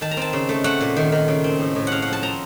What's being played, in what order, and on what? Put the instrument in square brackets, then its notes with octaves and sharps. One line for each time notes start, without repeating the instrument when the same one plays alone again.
[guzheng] D#3 A5
A#5
C4 A5
C#3
A3
A3 F#5
A#2
D#3
D#3
C#3
C4
A2
A2
C#3 F5 F#5
F#5
F3
A5
C4 A#5